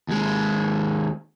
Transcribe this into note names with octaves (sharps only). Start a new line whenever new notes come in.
D#2 G#3